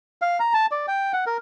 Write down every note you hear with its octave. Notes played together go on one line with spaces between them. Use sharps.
F5
A#5
A5
D5
G5
F#5
A#4